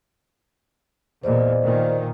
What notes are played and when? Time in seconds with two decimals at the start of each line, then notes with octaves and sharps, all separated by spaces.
1.23 E2 A#2 C5 D5 D#5
1.62 A#2 D#3